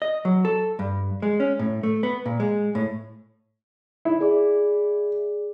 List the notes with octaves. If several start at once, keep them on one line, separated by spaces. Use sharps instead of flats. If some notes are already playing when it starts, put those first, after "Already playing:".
D#5
F#3
A4
G2
G#3
C#4
A2
A3
B3
A#2
G#3
A2
E4
G#4 D5 D6